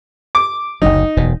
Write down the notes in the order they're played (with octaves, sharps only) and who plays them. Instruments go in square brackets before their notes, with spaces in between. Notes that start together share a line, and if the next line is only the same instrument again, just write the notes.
[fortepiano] D6
[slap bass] F#1 D2 F#3 [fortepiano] D#4
[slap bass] E1 F#2 B2